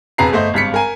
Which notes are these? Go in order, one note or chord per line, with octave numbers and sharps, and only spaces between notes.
E1 F2 G#4 B4 A#5 C7
G1 A3 C5 D#5
G#1 G2 B6 C#7
A#4 G#5